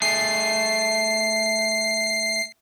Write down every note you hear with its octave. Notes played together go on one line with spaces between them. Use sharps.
A3 G#4 C7